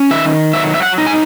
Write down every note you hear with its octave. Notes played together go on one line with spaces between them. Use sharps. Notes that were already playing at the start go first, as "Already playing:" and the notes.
Already playing: C#4
D#3 E5
F#3 E5
E5
F#5
D#4
G#5